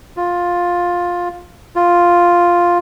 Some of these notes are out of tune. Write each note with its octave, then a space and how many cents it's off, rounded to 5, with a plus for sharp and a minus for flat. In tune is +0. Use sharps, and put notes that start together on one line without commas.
F4 +10
F4 +0